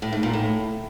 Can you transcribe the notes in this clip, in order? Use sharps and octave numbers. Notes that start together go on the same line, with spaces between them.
A2
G#2
A#2
A2